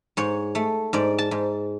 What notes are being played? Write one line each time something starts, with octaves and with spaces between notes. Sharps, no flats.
G#2 C#5
A3
G#2 D5
A5
G#2